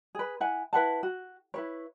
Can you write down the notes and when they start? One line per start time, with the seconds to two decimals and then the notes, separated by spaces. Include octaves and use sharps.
0.15 G#4 B4
0.40 E4 F#5 G#5
0.73 E4 B4 F#5 A5
1.03 F#4
1.54 E4 B4 C#5